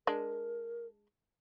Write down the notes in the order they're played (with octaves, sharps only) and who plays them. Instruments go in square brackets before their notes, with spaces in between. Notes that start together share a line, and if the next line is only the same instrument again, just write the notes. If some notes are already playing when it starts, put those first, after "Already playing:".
[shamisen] G#3 D4 [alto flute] A#4